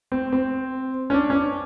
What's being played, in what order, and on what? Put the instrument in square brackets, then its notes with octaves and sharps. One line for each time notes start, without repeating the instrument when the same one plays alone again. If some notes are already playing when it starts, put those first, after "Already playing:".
[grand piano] C4
C4
C#4
D4
C#4
D4